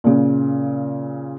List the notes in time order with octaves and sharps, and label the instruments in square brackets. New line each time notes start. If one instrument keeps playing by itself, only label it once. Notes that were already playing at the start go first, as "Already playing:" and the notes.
[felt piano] A#2 C#3